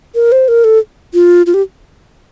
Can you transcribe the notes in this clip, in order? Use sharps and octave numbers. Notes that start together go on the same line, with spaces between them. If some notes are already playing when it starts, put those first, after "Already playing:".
A#4
C5
A#4
A4
F4
F4
G4